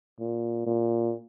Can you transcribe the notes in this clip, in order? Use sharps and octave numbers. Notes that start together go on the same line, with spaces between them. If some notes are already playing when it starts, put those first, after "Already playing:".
A#2
A#2